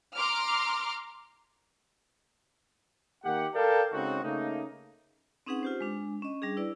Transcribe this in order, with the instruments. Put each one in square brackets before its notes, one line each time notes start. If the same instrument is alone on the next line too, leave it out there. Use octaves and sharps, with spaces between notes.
[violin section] A#5 C6 D6 F6
[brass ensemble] D#3 A#3 G4 F#5
A4 A#4 D5 F5 G5 A5
C#3 G#3 C4 D#4 F#4
C#3 A3 A#3 D#4
[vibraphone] C4 C#4 D#4 G#4 B4 F#5
F4 G4 C5
G#3 D4
C#4 D#5
G3 D4 G#4
E4 B4 D5